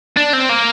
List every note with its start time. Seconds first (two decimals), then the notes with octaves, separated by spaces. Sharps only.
0.17 D4
0.33 C4
0.50 A#3